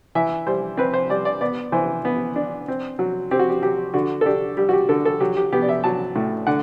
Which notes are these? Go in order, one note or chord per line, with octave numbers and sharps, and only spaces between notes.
E3 E5
G3 C5
C4 B4
C5
G3 D5
D5
B3 D5
E3 C5
B3
D4
C4
F#3
C4 G4
F#4
G4
F#3 G4
D3 F#4
A4
D4 G4
G3 G4
F#4
G4
D3 A4
A4
F#3 G4
G4
B3 G4
D5
E5
F#3 A5
A2
D3 F#5